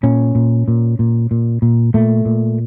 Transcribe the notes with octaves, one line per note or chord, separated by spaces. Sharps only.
A#2 C#4
A#2
A#2
A#2
A#2
A#2
A#2 A3
A#2